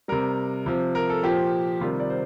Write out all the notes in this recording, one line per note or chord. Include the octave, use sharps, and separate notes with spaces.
C3 G3 A#4
C3 F3
A#4
A4
A#2 F3 G4
C3 D#3 G3 F4
D5
C5